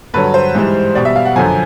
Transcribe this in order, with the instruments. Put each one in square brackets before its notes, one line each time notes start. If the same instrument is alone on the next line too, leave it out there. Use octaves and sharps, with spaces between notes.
[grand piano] G2 D3 F#3 B4
C5
G#2 E3 G3
B2 G3 D5
E5
F5
F#5
F#2 D3 F3 G#5